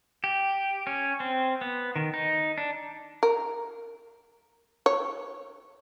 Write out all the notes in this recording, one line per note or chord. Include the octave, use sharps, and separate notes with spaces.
G4
C#4
C4
B3
D#3
D#4
D4
A#4
C#5